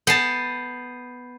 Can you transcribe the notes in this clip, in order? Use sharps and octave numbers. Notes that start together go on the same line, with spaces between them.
B3 A5 G6 C7